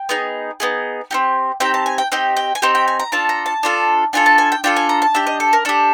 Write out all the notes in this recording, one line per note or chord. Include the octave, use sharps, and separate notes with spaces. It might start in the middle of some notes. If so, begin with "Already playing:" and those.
Already playing: G5
B3 D#4 G#4
B3 D#4 G#4
C4 D#4 G4
C4 D#4 G4 G5
A5
G#5
G5
C4 D#4 G4 G5
G5
G#5
C4 D#4 G4 G5
G5
G#5
A#5
D4 F4 A4 A5
A#5
A5
D4 F4 A4
D4 F4 A4 G#5
A5
G#5
G5
D4 F4 A4 G5
G#5
A#5
A5
D4 G4 E5
D#5
A4
A#4
D4 G4 A4